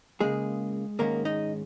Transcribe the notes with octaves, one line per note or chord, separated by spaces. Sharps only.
C#2 C#3 G#3 A#3 G#4
G#2 D#3 G#3 A#3 C#4 A#4
D#4 D#5